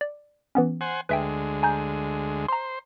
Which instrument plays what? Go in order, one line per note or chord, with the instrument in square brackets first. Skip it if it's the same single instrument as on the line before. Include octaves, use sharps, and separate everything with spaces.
[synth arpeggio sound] D5
E3 B3 C#4
[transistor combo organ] C5 F#5 G#5
[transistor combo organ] D2 G#3 [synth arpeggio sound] B4 E5 G5
[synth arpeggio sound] G#5 A#5 G6
[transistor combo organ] C5 [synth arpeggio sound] A#5 C6